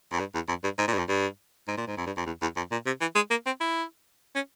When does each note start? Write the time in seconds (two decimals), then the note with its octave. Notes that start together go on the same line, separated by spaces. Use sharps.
0.12 F2
0.19 G2
0.34 E2
0.48 F2
0.64 G2
0.78 G#2
0.88 A#2
0.93 G2
0.98 F2
1.08 G2
1.68 G#2
1.77 A#2
1.87 G#2
1.97 F2
2.06 G2
2.17 F2
2.26 E2
2.42 E2
2.56 F2
2.71 A#2
2.86 C3
3.01 E3
3.15 G#3
3.30 A#3
3.46 C4
3.61 E4
4.35 C#4